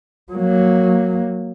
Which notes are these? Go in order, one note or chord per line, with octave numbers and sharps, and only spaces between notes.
F#3 A#3